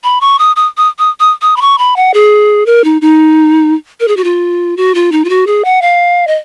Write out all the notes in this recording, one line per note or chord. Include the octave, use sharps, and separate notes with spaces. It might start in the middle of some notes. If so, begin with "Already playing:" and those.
B5
C#6
D#6
D#6
D#6
D#6
D#6
D#6
B5
C#6
B5
F#5
G#4
A#4
D#4
D#4
A#4
G#4
F#4
F4
F#4
F4
D#4
F4
F#4
G#4
F#5
F5
D#5